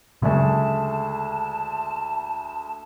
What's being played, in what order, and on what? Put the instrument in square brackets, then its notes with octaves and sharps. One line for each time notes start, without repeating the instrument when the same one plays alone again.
[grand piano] D2 G#3 A3 [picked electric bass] C#3 F#3 [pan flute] A5